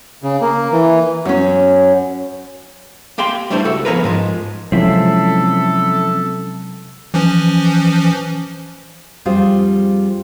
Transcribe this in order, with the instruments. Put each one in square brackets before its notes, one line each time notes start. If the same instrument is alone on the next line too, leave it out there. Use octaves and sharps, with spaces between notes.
[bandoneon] C#3
A#3
E3
[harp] F#2 C#4
[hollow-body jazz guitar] A#3 G4 G5 C6
G3 A3 B3 D4 E4 C5
C#2 F#4 A4
F3 B3 G#4 A#4 B4
G#2 F3 G#3
[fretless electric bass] C3 F#3 G#3 [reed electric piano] F3 C#4 [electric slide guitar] C4 E4 [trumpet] A4
[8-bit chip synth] E3 F3 C#4
[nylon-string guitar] F2 G3 F4 G#4 C5 F5